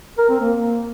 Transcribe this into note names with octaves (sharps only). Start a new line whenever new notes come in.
A#4
C4
A#3